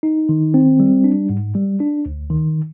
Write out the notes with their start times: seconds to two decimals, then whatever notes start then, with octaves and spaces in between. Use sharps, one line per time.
0.03 D#4
0.29 D#3
0.54 C4
0.80 G3
1.04 D4
1.30 G#2
1.55 G3
1.80 D4
2.06 D2
2.30 D#3